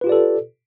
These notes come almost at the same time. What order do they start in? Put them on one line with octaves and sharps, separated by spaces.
B4 F4 G4 D5 A4